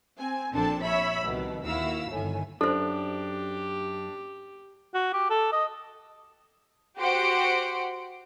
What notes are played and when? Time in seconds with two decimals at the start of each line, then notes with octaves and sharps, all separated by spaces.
0.19 C4 G#5
0.52 A#1 C4 D4 A4 A5
0.82 C#5 E5 B5 E6
1.25 C2 B2 D#3
1.66 D#2 E4 F#4 F5 E6
2.11 G1 A2 D#3 G#5
2.61 F#2 D4 G4 A4 C5
4.94 F#4
5.13 G4
5.30 A4
5.52 D#5
6.97 F#4 G4 C5 F#5 C6 D7